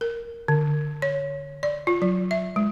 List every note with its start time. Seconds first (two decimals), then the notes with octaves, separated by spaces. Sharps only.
0.01 A#4
0.48 D3
1.02 C#5
1.63 D5
1.87 F4
2.02 F#3
2.31 E5
2.56 G#3